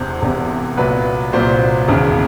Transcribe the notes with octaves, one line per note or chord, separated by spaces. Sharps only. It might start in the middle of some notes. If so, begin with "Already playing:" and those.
Already playing: E1 E2 C3 C5
E1 E2 C3
C2 A#2 F#3 B4
C2 A#2 F#3 C5
E1 D#2 C#3